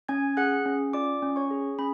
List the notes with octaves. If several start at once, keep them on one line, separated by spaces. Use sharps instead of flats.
C#4 G#5 G#6
G#4 F#5 F#6
C#4
F4 D5 D6
C#4
C#5 C#6
G#4
C#4 B5